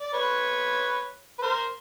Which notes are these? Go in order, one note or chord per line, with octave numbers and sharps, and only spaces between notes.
D5
B4 C#5
B4
A#4 C5